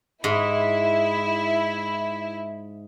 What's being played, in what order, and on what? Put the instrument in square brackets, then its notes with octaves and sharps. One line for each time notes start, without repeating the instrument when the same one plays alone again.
[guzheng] G#2 [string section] E4